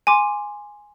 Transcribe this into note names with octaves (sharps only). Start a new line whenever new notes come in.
G#5 C6 D6